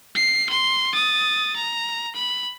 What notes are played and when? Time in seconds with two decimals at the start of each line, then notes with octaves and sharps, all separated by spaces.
0.15 C7
0.49 C6
0.93 D#6 A6
1.56 A#5
2.15 B5